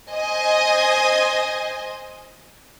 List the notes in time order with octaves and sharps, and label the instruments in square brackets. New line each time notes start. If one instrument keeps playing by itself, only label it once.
[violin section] C5 D#5 G#5